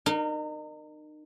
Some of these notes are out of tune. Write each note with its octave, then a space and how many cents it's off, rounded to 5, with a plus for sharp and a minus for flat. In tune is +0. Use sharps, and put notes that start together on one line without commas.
D#4 -35 A#4 -5